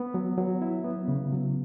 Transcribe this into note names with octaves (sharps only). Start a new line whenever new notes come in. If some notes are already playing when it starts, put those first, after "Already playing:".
Already playing: B3
F#3
F#3
E4
B3
C#3
F#3